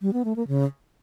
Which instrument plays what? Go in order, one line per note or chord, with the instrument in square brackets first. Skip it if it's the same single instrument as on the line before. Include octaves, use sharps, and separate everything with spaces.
[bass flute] G3
B3
A3
A#3
C#3